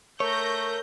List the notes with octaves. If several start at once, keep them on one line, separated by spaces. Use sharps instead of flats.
A3 A#4 C#5 G6 A#6